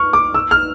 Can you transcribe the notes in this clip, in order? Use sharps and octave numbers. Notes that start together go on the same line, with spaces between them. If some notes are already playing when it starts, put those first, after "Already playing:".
Already playing: C#6 F6
D6
E6
F6